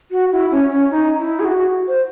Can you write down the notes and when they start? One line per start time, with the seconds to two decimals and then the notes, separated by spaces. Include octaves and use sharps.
0.11 F#4
0.32 E4
0.51 C#4
0.71 C#4
0.91 D#4
1.18 E4
1.40 G#4
1.45 F#4
1.88 C5